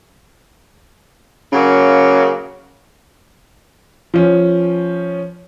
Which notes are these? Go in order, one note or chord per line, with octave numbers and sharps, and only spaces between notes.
C#3 F#3 A#3
F3 C#4